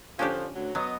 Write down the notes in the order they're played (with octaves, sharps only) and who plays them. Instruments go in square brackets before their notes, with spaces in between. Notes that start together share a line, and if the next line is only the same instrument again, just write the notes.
[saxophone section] D3 F3 [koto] C#4 D4 G4
[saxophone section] D2 F#3
[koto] F#3 [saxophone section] B3 D#5